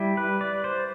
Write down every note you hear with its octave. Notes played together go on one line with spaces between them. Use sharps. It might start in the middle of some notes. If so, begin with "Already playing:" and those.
Already playing: G3 E4
B4
D5
C5